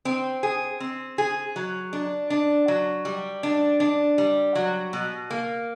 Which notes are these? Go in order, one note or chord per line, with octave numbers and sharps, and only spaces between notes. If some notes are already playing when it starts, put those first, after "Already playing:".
C4
G#4
C4
G#4
F#3
D4
D4
F#3
G3
D4
D4
G3
F#3
B2
A#3